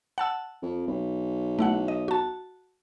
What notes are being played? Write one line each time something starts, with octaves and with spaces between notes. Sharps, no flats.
F#5 A5 E6
F2
B1
A3 E4 F#5
D#5
F#4 A5